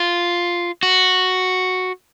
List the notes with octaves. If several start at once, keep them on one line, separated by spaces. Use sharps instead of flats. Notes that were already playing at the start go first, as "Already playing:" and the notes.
Already playing: F4
F#4